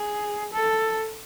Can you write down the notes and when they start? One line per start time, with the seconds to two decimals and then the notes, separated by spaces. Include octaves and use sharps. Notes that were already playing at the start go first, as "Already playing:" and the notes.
Already playing: G#4
0.53 A4